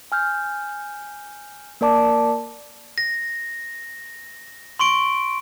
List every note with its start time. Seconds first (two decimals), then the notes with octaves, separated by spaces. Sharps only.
0.12 G#5 F6 G6
1.81 A#3 A#4 D5 A5 D6
2.98 A#6
4.79 C6 C#6 D7